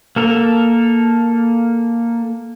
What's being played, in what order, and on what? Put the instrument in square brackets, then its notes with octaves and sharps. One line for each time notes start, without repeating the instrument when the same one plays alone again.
[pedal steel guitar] A#3 A4 A#4